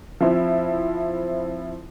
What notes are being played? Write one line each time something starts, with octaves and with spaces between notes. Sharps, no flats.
F3 C4 E4